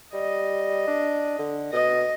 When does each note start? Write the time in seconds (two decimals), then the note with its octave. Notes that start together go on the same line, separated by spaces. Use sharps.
0.13 G3 D#5
0.87 D4
1.39 D3
1.73 B2 D#5